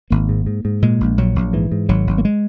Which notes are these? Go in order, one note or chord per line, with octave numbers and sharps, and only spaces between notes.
G#1 A#3
G#2
G#2
G#2
A#2 G#3
A#1
A#1 F#3
A#1
G#2 E3
G#2
G#1 F#3
G#1
A#3
G#3